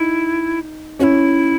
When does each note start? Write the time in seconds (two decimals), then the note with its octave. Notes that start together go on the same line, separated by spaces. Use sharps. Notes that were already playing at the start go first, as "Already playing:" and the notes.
Already playing: D#4 E4
0.99 C#4 F#4
1.03 E4